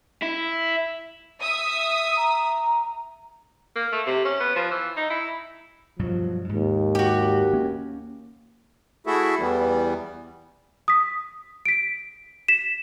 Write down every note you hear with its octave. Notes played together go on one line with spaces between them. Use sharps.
E4
E5 D#6
A#5
A#3
A3
C3
C#4
B3
F3
E3
D#4
E4
G2 B2 F3 F#3
D#2 G#2
F#4 G4
A#3 C#4
A3 E4 F#4 G#4 A4 E5
E2 E3 G3 B3
D#6 B6
B6 D7
B6 E7